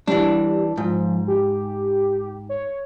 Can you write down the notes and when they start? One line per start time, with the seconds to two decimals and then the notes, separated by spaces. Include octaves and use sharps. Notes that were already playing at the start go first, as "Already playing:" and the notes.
0.07 E3 G3 D4
0.77 G#2 F3
1.28 G4
2.49 C#5